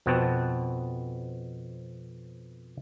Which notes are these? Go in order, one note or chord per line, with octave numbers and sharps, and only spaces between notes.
F2 B2 B3 C4 F#4 A5